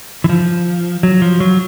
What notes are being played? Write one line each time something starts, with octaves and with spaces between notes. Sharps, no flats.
E3
F3
F#3
F3
F#3